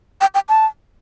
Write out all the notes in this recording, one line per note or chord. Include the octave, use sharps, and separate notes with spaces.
G5
G5
A5